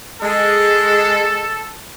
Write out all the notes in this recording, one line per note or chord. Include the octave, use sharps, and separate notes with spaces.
G#3 A4